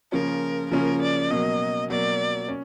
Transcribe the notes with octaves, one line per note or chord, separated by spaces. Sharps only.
C#3 F3 A#3 C#4 F4 A#4
C#3 F3 A#3 C#4 F4 A#4
D5
B2 F#3 A#3 D#5
B2 F#3 A#3 D5
C#4